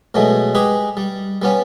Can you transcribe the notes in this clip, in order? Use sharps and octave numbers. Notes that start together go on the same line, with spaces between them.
B2 F#3 G#3 A3
G#3 G4 G#4 B4
G3
G3 B3 C#4